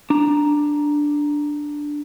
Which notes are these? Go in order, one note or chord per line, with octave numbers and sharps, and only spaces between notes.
D4 A#5